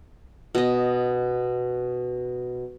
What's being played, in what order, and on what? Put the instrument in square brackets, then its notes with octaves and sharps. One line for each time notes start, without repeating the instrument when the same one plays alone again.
[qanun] B2 D#5